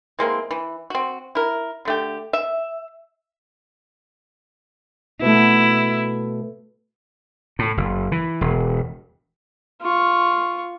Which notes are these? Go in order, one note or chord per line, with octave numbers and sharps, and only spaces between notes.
E3 G#3 A#3 C4
E3
C4 F#4
E4 A#4
D3 A3 G4
E5
B2 A3 E4
A2
F#1
E3
E1
F4 C#6